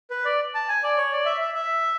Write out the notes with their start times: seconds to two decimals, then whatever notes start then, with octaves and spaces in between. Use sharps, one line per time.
0.10 B4
0.25 D5
0.54 A5
0.68 G#5
0.83 D5
0.97 C#5
1.12 D5
1.25 E5
1.41 E5
1.55 E5